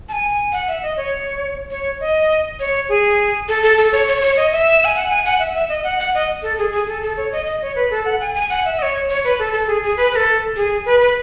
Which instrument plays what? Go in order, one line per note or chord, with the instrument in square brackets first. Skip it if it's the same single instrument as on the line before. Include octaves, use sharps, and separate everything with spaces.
[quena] A5
G#5
F#5
E5
D#5
C#5
C#5
D#5
C#5
G#4
A4
A4
A4
C#5
C#5
C#5
D#5
E5
G#5
F#5
G#5
F#5
E5
E5
D#5
F#5
F#5
D#5
A4
G#4
G#4
A4
A4
C#5
D#5
D#5
C#5
B4
A4
F#5
G#5
G#5
F#5
E5
D#5
C#5
C#5
B4
A4
A4
G#4
G#4
B4
B4
A4
G#4
B4
B4